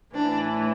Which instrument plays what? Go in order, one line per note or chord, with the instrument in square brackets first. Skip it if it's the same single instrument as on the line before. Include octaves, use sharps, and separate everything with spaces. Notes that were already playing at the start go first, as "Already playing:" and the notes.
[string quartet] A2 E3 D4